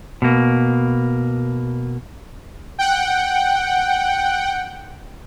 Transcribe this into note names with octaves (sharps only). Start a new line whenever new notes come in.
B2 A#3
F#5 G5